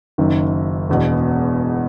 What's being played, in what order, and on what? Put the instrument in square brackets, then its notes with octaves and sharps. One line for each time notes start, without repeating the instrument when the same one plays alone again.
[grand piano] F#1 F#2 D#3
E1 E2 B2